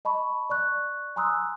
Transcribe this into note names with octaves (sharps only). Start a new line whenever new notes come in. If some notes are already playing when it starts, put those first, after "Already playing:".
D#5 A5 B5 C#6
D5 C#6 F#6
G#5 A#5 C6 D#6 E6 F#6